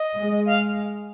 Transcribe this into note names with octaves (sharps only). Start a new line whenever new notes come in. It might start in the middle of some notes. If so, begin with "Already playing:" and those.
Already playing: D#5
G#3
F5